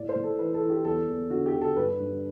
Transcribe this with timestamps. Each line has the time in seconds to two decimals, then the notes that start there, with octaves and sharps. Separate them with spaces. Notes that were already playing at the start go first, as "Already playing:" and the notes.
Already playing: A2 D5
0.09 C5
0.15 A2
0.23 A4
0.39 E3 B4
0.54 A4
0.62 E3
0.70 G4
0.85 E2 A4
1.07 E2
1.30 D3 F#4
1.46 G4
1.54 D3
1.61 A4
1.76 G2 B4
2.00 G2